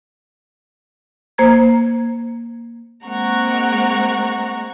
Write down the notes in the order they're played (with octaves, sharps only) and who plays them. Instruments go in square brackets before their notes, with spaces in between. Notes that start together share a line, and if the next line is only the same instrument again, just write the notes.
[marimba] A#3 C5 A#5 G#6
[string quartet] G#3 A#3 C4 F#5 A#5 C#6